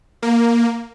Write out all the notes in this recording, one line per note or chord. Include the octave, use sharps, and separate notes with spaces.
A#3